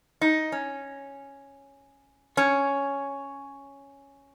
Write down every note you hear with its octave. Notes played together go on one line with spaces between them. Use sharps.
D#4
C#4
C#4